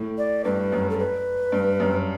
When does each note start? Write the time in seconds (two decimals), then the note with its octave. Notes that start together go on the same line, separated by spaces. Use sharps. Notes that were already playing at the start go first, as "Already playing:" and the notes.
Already playing: A2
0.18 D5
0.44 G2 B4
0.72 F#2
0.90 A4
0.99 B4
1.52 G2
1.80 F#2